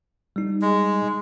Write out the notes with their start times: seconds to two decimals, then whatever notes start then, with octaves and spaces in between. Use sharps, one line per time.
0.36 G3 D#4
0.62 G#3